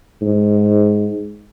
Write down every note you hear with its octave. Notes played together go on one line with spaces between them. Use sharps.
G#2